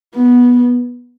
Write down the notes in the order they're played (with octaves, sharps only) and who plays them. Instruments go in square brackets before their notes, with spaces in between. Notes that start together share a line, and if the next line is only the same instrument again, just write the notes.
[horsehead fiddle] B3